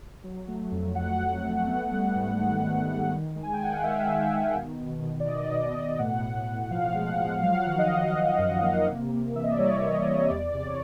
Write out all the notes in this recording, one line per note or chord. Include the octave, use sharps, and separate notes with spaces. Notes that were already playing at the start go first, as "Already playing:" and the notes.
F#3
A3
F2
F#3 F#5
F#3
A3
B3
G3
G#2
D#3
G#2
G3
D#3
G#3
G#5
G5
D#3 F#5
F5
D#3 E5
D#3
D#3
B2
B2
B2
D5
B2 D#5
B2
D#5
B2
A2 F#5
A2
A2
F3 F5
G#3
F#5
F3
F#3 F5
F#5
F5
D#3
D#5
F#3
F#3
F#2
A#3
C3
C3
E3 E5
D#5
D5
G3 C#5
C3 D5
D#5
G3
C#5
E2 D5
C3 D5
C#5